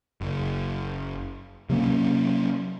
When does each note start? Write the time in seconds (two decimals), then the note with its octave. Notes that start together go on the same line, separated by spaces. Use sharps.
0.21 F#1
1.69 C3 F#3 A#3 C#4